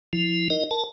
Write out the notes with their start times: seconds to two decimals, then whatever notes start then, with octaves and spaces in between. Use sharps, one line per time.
0.13 F3 E4
0.50 D#4 A#4 D#5
0.71 A#4 A5